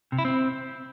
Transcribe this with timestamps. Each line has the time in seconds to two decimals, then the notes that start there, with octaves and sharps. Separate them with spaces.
0.12 C3
0.18 E4
0.25 C4